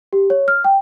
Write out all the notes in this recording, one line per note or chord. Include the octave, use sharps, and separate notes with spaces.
G4
C#5
F6
G5